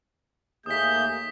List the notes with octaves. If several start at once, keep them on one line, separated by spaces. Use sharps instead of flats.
D#2 A3 A#3 G#4 D#6 G6 B6